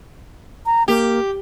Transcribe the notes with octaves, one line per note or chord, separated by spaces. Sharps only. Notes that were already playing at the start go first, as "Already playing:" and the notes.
A#5
A#3 G4